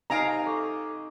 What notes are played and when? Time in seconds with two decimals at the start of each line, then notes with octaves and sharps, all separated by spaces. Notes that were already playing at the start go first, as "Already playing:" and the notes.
0.10 C3 D#4 D#5 F5 G#5 A#5 F6 D7
0.46 A4 C#6 D6